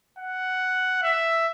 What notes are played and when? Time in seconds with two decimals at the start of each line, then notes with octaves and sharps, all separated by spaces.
0.18 F#5
1.03 E5